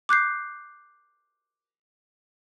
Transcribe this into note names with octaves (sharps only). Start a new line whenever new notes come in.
D6 F#6 G6 C7